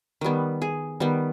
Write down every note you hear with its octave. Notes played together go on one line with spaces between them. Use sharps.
D#3 G3 B3
G#4
D#3 G3 B3